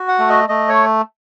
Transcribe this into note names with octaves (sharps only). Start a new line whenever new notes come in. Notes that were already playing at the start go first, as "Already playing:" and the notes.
Already playing: F#4
F#5
A3
D#5
A3 D#5
C#5